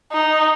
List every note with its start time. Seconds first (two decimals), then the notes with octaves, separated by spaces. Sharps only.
0.13 D#4